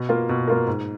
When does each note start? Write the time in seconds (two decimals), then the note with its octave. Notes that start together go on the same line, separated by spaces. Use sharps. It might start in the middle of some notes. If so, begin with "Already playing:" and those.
Already playing: B2
0.09 A#3 F4 A#4
0.29 B2
0.48 A#3 F4 A#4
0.67 G#2